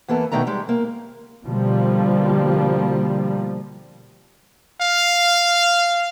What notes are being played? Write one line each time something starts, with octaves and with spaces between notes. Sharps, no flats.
E2 E3 A#3 B3 A4
B2 D#3 F#3 A3 D4 A#5
G3 G#3
A#3
B2 D3 F3 G3 A#3
F5